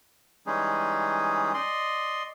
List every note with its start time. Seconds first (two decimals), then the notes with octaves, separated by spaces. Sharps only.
0.46 E3 G3 G#3 C#4 D#4 G#4
1.54 D5 D#5 C6